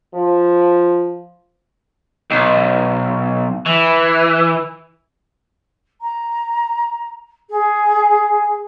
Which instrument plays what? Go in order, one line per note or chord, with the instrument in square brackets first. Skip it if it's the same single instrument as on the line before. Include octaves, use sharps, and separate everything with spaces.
[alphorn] F3
[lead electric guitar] B1
E3
[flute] A#5
G#4